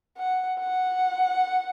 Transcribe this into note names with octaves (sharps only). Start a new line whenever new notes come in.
F#5
F#5